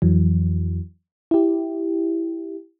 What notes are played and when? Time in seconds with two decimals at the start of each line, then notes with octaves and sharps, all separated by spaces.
0.02 F2 E3 F#3
1.31 E4 G4